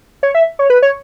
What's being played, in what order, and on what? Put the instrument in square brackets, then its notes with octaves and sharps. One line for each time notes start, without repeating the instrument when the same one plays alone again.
[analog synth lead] C#5
E5
C#5
B4
C#5